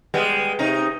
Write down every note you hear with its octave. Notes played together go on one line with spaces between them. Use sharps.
G3 G#3 B3
C3 D#4